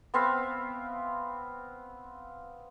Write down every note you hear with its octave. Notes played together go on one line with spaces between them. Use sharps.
B3 C4 E5 F5